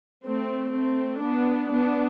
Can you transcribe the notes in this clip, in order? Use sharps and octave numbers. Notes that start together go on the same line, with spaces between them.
A3 C4
A3 C4
B3 D4
B3 D4